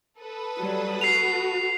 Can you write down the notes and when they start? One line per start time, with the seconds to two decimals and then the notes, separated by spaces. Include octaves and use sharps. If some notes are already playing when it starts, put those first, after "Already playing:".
0.19 A4 B4 D#6
0.58 F#3 G3
1.01 F#4 C7 F7